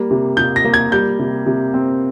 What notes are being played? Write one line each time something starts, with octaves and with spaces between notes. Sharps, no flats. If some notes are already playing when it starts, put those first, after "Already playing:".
Already playing: G3 A#3
C3
C3 G6
A#6
A#3
G#6
G3 G6
C3
C3
C4